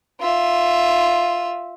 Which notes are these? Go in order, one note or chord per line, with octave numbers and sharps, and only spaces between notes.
F4 E5